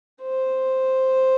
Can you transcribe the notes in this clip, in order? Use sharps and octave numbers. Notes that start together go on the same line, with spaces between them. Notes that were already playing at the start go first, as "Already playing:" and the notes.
C5